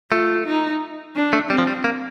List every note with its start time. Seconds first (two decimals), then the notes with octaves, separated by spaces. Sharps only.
0.11 A3 F4
0.46 D#4
1.15 D4
1.33 A3
1.50 G3 C4
1.58 F3
1.67 G3
1.84 A#3